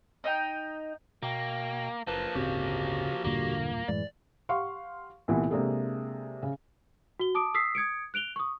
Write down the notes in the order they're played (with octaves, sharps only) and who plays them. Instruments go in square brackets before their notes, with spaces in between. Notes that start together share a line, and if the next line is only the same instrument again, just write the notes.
[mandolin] D#4 D#5 G5
[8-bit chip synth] B2 G5 [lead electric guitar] A#3
[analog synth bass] F#1 [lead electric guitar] F3 A#3 [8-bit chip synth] B4 A5
[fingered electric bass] D1 G1 C4 [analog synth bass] C#3 [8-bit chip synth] F#4 G4
[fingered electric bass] E1 G2 A#2 [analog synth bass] D3 [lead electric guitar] A#3
[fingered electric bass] F#2 A2 G#3 [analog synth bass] E3 [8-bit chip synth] D5
[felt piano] G4 F5 F#5 C6 C#6
C2 A#2 E3 B3
C3 G#3 A#3 D4 G#4 A4
C#3
[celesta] F#4 G7
A5 D6 D#6 D7
D#6 E6 B6 C7
D#6 G#6 C#7 D7
F#6 D7 F7 G7
C#6 D#6